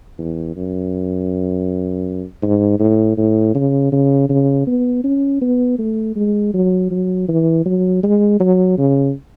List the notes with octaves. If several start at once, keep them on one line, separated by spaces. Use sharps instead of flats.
E2
F#2
G#2
A2
A2
C#3
C#3
C#3
B3
C#4
B3
A3
G#3
F#3
F#3
E3
F#3
G#3
F#3
C#3